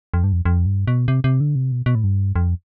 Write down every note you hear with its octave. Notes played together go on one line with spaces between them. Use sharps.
F2
G2
F2
F2
G2
B2
C3
C3
D3
C3
B2
B2
A2
G2
F2